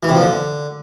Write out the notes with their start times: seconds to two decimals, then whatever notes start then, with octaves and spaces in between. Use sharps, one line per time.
0.03 E3
0.09 C3
0.15 F3
0.21 D3